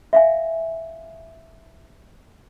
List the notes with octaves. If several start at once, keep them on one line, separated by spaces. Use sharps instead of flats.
E5 F5 G#5